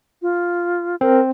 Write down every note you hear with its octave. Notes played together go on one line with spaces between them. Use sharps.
F4
C4 A#4